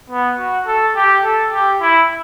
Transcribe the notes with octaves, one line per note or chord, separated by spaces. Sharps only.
B3
F#4
A4
G4
A4
G4
E4